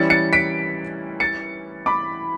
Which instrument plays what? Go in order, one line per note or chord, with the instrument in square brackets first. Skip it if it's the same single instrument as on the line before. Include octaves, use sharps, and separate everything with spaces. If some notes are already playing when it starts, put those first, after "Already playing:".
Already playing: [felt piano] E3 G3 C#4 E4 [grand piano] A6 C#7
[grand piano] A6 C#7
B6 D7
A6 C#7
B5 D6